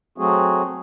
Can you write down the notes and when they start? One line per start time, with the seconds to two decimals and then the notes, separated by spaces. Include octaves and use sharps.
0.18 F#3 A3 C4 F#4 G#4